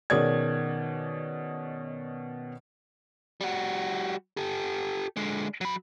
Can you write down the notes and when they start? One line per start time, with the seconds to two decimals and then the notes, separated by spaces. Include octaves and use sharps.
0.10 B2 D#3 C#4 G#4 D5 G#6
3.41 G3 F#4
4.37 G4 A4
5.17 D3 G#3
5.61 F#3 B5